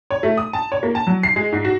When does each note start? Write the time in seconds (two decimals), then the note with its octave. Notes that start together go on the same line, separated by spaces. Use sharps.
0.11 C#5
0.23 A3
0.37 D#6
0.53 A5
0.72 C#5
0.83 A#3
0.95 A5
1.07 F#3
1.23 C7
1.36 G#3
1.52 G#2
1.65 F#4